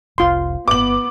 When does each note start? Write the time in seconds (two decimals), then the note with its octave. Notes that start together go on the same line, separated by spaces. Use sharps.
0.18 F1 C2 F4 C6
0.68 G1 B3 D6 F#7